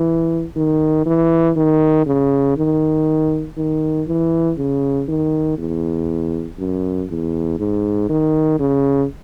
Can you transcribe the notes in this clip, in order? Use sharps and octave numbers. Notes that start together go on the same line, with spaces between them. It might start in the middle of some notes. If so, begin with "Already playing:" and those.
Already playing: E3
D#3
E3
D#3
C#3
D#3
D#3
E3
C#3
D#3
E2
F#2
E2
G#2
D#3
C#3